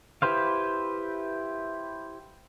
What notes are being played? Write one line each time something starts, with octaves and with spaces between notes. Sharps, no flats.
E4 G4 B4 C5 F5